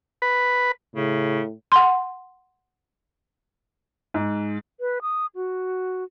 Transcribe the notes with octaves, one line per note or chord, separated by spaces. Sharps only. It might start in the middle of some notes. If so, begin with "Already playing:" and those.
B4
A2 C#3
F#5 C6
G#2
B4
D#6
F#4